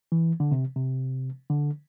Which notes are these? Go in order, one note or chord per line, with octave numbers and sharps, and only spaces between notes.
E3
D3
C3
C3
D3